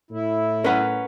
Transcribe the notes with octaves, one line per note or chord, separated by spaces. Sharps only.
A2 E4
C#4 A#4 B4 F#5